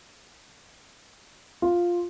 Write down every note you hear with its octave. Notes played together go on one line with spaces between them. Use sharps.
F4